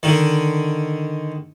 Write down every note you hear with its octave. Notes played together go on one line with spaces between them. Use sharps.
D3 D#3